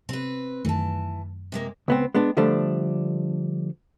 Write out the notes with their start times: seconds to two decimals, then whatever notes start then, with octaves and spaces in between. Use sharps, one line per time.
0.09 C3 C4 B4
0.65 F#2 D#3 E3 A3 A5
1.52 C3 G#3 A#3
1.88 C#2 B3 C4
2.15 G#3 B3 D4
2.37 D3 F3 G3 A3 D4